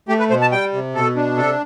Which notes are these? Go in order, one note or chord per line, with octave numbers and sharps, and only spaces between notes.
A3 G4
B4
B2 C5
A5
G3 G5
C3
B2 A4
D4
C3 A4